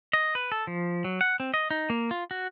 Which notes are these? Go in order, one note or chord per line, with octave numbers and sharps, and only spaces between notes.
D#5
B4
A4
F3
F#3
F#5
C4
D#5
D#4
A#3
F4
F#4